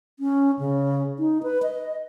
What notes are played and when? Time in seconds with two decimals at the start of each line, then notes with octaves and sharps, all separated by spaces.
0.19 C#4
0.59 C#3
1.19 D#4
1.43 B4
1.63 D#5